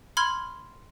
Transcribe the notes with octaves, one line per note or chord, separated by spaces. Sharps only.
B5 C6 F6 G#6